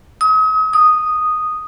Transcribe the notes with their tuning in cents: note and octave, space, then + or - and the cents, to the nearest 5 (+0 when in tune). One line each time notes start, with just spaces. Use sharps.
D#6 +40
D#6 -5